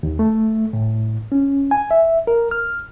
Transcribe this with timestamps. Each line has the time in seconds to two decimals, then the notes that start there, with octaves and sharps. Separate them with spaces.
0.03 D#2
0.19 A3
0.73 A2
1.32 C#4
1.71 G#5
1.91 E5
2.27 A#4
2.51 F6